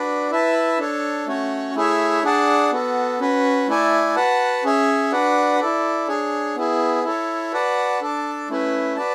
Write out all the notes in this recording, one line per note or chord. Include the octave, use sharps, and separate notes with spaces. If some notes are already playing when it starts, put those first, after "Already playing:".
Already playing: D4 F#4 B4 D5
E4 B4 E5 A5
D4 A4 C#5
A3 C#4 F#4 C#5
A3 E4 G#4 C#5 E5
D4 G#4 D5 F#5 A5
B3 F#4 A4
C#4 F#4 B4
A3 E4 A4 D5 G#5
F#4 B4 F#5 A5
C#4 G#4 C#5 E5
D4 F#4 B4 D5 F#5
E4 A4 D5
D4 G#4 C#5
B3 E4 G#4
E4 A4 C#5
F#4 B4 D5 F#5 A5
D4 A4 D5 A5
A3 C#4 E4 B4
F#4 B4 D5 A5